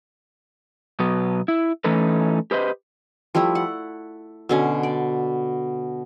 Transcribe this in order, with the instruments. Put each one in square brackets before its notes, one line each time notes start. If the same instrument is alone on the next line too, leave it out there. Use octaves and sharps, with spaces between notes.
[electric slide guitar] B2 F#3 B3
E4
E3 A3 C#4 D#4 A4 B4
G4 B4 C5 D#5
[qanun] F3 G3 A3 E4
F#5
B2 D3 C#4
D5